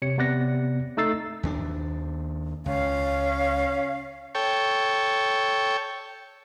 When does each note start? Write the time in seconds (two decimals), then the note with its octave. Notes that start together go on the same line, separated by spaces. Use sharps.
0.02 C3 C#5 C#7
0.18 C3 B3 D5 F#6 A#6
0.97 A3 D#4 A4 E6 A6 C7
1.43 D#2 G#3 D4
2.66 C#2 C#4 F5
4.35 A4 C#5 G5